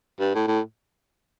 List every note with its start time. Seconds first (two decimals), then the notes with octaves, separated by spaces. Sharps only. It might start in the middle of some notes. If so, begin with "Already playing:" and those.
0.20 G2
0.35 A2
0.48 A2